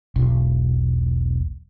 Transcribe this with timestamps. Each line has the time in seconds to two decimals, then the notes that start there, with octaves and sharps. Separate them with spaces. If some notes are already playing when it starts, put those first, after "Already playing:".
0.16 E1 B1